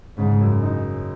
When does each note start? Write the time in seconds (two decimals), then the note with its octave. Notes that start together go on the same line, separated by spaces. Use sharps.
0.17 G#2 C#3
0.41 F#2
0.63 D#4